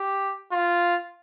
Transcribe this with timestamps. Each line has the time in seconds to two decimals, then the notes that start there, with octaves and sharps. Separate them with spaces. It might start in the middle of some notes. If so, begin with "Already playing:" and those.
Already playing: G4
0.52 F4